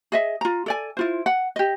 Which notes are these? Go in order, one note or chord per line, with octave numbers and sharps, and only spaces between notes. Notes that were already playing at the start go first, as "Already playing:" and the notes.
G#4 D#5 E5
F4 A#5
A4 D5 G#5
E4 F4 C5
F#5
G4 D#5